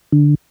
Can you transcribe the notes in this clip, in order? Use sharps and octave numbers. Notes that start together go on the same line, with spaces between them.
D3